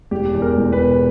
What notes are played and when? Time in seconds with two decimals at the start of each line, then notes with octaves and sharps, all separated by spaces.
0.11 E1 G4
0.35 E2
0.42 A#4
0.58 E1
0.73 B4
0.80 B2